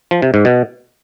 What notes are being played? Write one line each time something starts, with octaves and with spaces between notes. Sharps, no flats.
F3
C3
G#2
B2